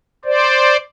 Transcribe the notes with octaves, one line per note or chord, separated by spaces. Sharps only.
C5 D5